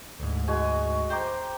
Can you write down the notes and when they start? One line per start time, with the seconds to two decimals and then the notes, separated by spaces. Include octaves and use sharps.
0.20 D2 G#2
0.48 G#3 F#4 G#5
1.10 C5 G5 A#5 D6